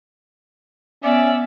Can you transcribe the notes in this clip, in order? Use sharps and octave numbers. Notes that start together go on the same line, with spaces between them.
B3 C#4 D5 E5